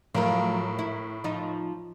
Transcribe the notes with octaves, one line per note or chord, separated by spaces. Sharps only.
A2 F3 F#3 A#4
E4
F3 D#4